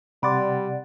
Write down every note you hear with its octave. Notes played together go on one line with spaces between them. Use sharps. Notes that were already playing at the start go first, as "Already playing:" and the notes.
C3 G3 D5 F#5 B5 C6 D6 A6